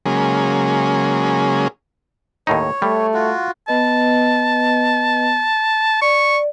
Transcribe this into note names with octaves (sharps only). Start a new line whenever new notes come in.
C#3 F#3 G#3 A#3 C#4 G#4
D#2 A2 D#4 C#5
G3 A3
F4 F#4
B3 B4 D#5 A5
D5 C#6